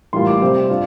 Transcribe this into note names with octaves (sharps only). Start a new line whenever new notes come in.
A2 E3 G3 A#3 F4 C6
D6
C3 G3 C4
D4 F4